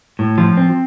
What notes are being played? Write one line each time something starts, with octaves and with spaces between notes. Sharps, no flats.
A2
F3
C4